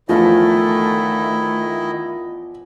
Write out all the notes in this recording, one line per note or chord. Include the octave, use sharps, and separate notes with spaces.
E2 D#3 F3 A3 E4 D#5